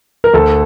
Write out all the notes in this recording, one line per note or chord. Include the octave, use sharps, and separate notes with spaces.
A#4
D2 A4